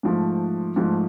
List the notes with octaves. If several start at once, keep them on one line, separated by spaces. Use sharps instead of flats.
G#2 F3 A3
G#2 F3 A3